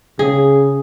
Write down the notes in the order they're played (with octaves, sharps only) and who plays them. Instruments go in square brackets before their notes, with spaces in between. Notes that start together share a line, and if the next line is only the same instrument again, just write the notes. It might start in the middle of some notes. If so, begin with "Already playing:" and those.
[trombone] C#3 [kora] G#4